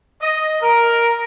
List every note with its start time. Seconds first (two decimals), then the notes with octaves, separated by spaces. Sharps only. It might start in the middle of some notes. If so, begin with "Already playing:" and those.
0.22 D#5
0.62 A#4